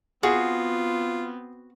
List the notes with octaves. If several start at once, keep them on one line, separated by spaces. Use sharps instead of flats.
B3 C4 F4 F#4 G#4